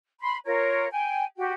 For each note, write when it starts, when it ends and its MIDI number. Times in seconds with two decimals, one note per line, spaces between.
0.20 0.35 83
0.20 0.35 84
0.45 0.86 65
0.45 0.86 70
0.45 0.86 73
0.91 1.24 79
0.91 1.24 80
1.37 1.53 66
1.37 1.53 67
1.37 1.53 79